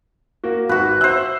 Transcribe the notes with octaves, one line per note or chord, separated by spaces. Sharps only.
A#3 F#4
G#1 F#4 B4
C5 E5 F#6